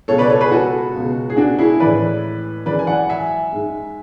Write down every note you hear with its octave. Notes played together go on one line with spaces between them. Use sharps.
C#2 B2 G#3 A4 C#5
B4 D5
A4 C#5
G#4 B4
F#4 A4
C#2 B2 G#3
G#4
D4 F#4
E4 G#4
A2 E3 G#3 B4 D5
F#2 E3 G#3 B4 D5
G#5
D5 F#5
E5 G#5
G#2 G#3